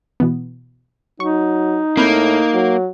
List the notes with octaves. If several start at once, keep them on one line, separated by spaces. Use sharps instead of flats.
B2 E3 B3
F#3 D#4 C#6
A2 A#3 C4 B5 G6
F#3